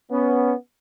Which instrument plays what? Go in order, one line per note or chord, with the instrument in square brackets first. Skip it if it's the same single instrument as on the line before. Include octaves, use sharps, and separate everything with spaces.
[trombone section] B3 C#4